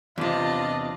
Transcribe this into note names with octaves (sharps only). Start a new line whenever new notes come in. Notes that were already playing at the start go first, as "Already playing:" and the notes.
E2 C3 D4 F4 D#5